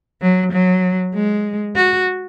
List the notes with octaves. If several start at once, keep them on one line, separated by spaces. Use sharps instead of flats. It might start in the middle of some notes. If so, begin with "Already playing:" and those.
F#3
F#3
G#3
F#4